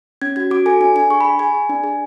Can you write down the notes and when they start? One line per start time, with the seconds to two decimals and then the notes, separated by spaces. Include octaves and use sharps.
0.22 C#4 G#6
0.36 F#4 G#6
0.51 F#4 D6
0.66 A4 G#5
0.80 D4 G#5
0.96 D4 G#5
1.10 G#4 C#6
1.21 G#4 B5
1.39 G#4 G#5
1.55 G#4
1.69 D4
1.84 G#4